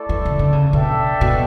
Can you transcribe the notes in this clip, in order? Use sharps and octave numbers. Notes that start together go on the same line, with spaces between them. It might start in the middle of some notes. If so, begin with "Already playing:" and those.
Already playing: A3 E4 A4 D5
E3
C#3
D3
C#3
B2 D4 A4 E5 G5
B2